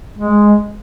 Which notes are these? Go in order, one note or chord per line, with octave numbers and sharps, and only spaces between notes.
G#3